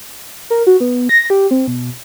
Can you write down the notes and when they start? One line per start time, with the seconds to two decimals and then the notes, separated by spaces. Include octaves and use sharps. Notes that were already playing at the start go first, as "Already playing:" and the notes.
0.50 A#4
0.67 F#4
0.80 B3
1.09 A#6
1.30 G4
1.51 C4
1.68 B2